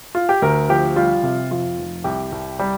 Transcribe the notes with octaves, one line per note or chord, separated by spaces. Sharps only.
F4
G4
D2 A#4
F3 G4
G3 F4
C3
F2 F4
F1
C2 G4
C2
G3